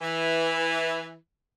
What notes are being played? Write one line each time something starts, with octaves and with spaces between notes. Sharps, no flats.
E3